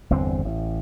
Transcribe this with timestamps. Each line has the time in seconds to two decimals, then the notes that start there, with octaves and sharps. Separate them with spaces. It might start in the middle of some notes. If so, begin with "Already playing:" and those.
0.10 G1 E2 D3 C4
0.45 A1